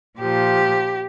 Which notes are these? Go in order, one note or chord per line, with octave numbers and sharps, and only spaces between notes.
A#2 F3 G4